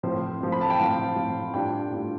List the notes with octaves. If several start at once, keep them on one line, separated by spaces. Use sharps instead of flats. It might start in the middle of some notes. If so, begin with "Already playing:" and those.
A2 F3 C4 C5
A2 F3 C4
B5
A5
G5
A2 F3 C4 F5
A2 F3 C4
A2 G3 D4 F4 G5
A2 G3 D4 F4